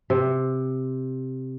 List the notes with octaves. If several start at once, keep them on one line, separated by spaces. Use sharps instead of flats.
C3